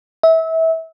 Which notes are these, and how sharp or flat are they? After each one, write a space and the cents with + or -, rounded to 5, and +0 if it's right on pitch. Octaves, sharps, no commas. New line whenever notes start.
E5 -25